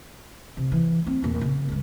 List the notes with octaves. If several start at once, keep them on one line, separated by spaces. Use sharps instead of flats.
C3
E3
C4
A#1 E2
C#3
C#2 G2